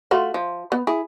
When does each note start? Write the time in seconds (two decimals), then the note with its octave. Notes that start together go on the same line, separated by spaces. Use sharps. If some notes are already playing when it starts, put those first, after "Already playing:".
0.11 A3 F4 F#4
0.34 F3
0.72 B3
0.87 E4 G#4